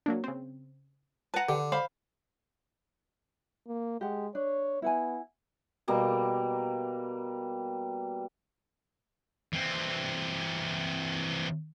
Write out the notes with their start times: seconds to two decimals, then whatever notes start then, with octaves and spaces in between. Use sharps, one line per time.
0.06 F#3 A#3 D4
0.24 C#3 C4
1.34 B4 F#5 A5 A#5
1.49 D3 G4
1.72 C5 F5 B5
3.67 A#3
4.01 G#3 G4 F#5
4.35 D4 C#5
4.82 B3 E4 F#5 G#5
5.88 B2 G3 A#3 A#5
9.53 E3 C4